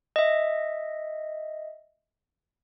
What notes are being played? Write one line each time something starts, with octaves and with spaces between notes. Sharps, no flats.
D#5 E5